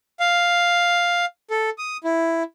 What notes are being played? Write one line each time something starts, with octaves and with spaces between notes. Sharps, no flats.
F5
A4
D#6
E4